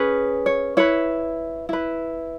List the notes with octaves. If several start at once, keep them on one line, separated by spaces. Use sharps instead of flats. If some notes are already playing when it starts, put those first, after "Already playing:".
Already playing: C#4 G#4 B4
C#5
E4 B4 C#5
E4 B4